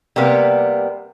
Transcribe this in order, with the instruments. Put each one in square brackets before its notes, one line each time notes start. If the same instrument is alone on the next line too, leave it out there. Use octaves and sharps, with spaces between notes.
[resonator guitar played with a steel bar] C3 G3 A#3 B3